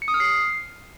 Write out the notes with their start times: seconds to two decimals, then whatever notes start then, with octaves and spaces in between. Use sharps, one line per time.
0.02 C#7
0.08 D#6
0.14 F6
0.20 C7